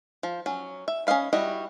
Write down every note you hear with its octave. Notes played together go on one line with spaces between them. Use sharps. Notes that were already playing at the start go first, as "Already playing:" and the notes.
F3
F#3 C#4
E5
C#4 C5 D#5 F5 B5
G3 E4 F#4 D#5